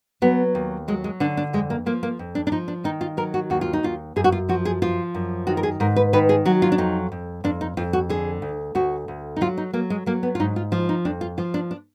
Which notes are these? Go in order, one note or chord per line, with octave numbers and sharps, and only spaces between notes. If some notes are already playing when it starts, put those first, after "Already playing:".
F#3 B3
D#2
F#3 G#3
G#3
D3 D4
D4
F2 G#3
A#3
F3 A#3
A#3
F2
D4
D4
F3 D#4
D4
D#3 D#4
F4
F#3 A#4
F#4
D#2 F#4
F4
D#4
D#2 F4
F#2 G#4
F#4
F4
F3 F#4
G#4
F3 F4
F#2
D#3 F#4
A#4
G#4
G#2 A#4
B4
D#3 B4
G#4
F#3 F#4
F4
D4
F2 D#4
F2
F2 D4
D#4
F2 F4
F#4
D3 G#4
D2
D2 F#4
D2
D#4
F#3 F4
D#4
F#3 A#3
G#3
F#3 A#3
B3
F4
G#2 D#4
F4
F3 F4
D#4
F2 D4
F4
F3 F4
D4
D4